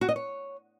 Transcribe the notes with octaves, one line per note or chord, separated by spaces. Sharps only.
F#4
D#5
C#5